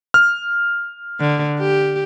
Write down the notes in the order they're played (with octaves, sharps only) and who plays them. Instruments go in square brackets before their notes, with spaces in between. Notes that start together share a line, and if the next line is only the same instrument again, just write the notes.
[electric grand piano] F6
[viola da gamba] D3
G4